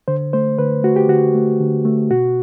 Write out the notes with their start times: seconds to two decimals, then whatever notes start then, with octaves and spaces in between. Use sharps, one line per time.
0.08 D3 C5
0.33 A3 C5
0.58 D3 B4
0.83 A3 F#4
0.96 G4
1.09 D3 F#4
1.34 A3
1.60 D3
1.85 A3
2.11 B2 F#4